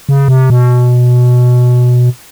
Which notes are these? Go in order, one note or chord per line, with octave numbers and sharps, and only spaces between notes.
C#3
C3
B2